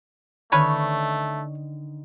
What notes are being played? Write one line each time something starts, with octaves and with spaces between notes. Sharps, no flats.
D3 D#3 A3 C#4 B4 C#5 D#5